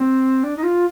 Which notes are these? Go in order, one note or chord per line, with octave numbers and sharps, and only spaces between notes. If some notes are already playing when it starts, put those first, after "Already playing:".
Already playing: C4
D4
D#4
F4